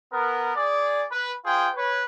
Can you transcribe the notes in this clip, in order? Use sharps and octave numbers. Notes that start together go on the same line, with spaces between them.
B3 A#4
G#4 D5
B4
F4 G#4 C5 G5
B4 C#5